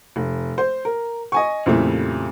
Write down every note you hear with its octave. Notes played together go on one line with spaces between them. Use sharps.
F1
C5
A#4
D#5 G#5 C#6
F2 A#2 C#3 G3 A3 E4